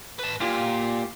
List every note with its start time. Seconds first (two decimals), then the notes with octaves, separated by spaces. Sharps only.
0.19 B4 A5
0.40 A#2 F4 G4